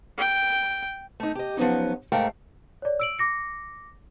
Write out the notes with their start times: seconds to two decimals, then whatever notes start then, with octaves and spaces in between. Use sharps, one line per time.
0.18 G5
1.20 A3 D#4
1.35 G4 D#5
1.57 F3 F#3 B3 C#4 D#4
2.12 G#2 A3 A#4 F5 G5 A#5
2.82 C#5 D5
3.00 E6 D7 F#7
3.19 D6 A#6 C#7